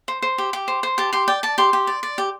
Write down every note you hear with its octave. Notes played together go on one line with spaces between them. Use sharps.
C5
C5
G4
G4
C5
C5
G4 A5
G4 C6
D5 G5
D5 A5
G4 C6
G4
D5
D5
G4